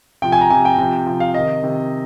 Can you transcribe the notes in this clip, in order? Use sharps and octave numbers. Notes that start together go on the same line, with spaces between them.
C3 F3 G5
G#5
A#5
C3 F3 G#5
G5
C3 F3
C3 F3
F5
C3 D#3 D#5
C3 D#3